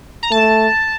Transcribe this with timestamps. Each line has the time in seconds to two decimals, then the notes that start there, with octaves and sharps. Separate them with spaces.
0.23 A#5
0.31 A3 A5